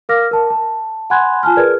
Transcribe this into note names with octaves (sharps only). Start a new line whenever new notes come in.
A#4 F5 D6 F6 A#6
A#4 A5
A5
F#5 G#5 B5 C6 F#6 G#6
F4 G#5 A5 F6
G#4 A#4 B4 D5 F6 G#6